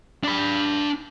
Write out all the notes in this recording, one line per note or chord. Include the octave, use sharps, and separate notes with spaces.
D4 B5